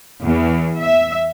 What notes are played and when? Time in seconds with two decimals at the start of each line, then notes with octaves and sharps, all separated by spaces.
0.21 E2
0.79 E5